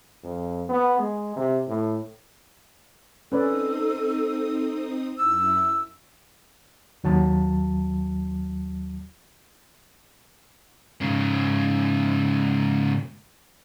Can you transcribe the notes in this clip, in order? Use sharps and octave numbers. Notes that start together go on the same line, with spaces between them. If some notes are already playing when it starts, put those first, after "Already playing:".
F2
B3
G#3
C3
A2
C4 C#4 D#4 A4 B4 D5 D#6
F#2 E4 E6
D#2 F#3 A5
G#2 C#3